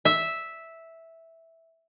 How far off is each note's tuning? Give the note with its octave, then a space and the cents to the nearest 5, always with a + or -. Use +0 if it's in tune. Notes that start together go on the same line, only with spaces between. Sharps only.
E5 -5